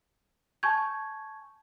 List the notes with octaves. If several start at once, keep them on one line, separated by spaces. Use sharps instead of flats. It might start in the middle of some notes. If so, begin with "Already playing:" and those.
G#5 A5 C#6 G6 G#6